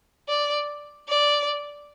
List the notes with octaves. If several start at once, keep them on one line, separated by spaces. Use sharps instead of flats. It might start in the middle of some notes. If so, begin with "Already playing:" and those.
D5
D5